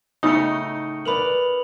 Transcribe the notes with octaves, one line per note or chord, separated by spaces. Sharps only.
A2 C#3 A3 D#4 D#6 C#7
A#4 B4 D5 B5 F7 F#7